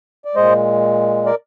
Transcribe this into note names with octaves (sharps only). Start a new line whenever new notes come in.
D5
A#2 G#3 C5 D#5
A#4 D5